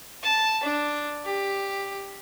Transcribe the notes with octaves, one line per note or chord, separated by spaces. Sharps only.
A5
D4
G4